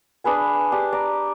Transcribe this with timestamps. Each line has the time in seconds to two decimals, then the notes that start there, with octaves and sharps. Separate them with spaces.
0.24 D4 G#4 B4 G#5
0.72 D4 G4
0.93 D5 A#5